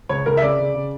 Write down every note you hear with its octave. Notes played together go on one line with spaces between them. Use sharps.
C#2 C#5
C#2 A#4
E5
C#3 D5
C#3
C#3